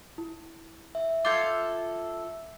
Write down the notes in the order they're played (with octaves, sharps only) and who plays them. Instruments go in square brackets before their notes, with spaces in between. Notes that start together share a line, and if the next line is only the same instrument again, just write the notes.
[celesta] E4
[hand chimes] E5
[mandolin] F4 A4 [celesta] D6 G6 G#6